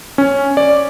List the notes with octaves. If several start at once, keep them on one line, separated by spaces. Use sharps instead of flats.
C#4
D5